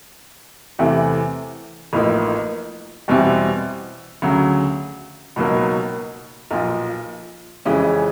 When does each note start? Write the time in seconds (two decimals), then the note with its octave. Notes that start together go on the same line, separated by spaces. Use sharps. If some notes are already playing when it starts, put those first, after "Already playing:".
0.79 E2 C3 E3 A3
1.93 A1 A2 F3 A#3 D#4
3.08 E2 B2 G3 C4 E4
4.22 D2 C#3 F#3
5.36 C#2 B2 F#3 A#3 D#4
6.51 B1 A#2 F3
7.65 F2 C#3 E3 G#3 C#4